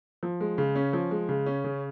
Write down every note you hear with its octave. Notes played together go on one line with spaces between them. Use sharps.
F3
G#3
C#3
C#4
F3
G#3
C#3
C#4
C#3